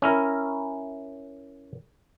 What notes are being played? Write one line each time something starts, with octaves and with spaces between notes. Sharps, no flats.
C#4 E4 A#4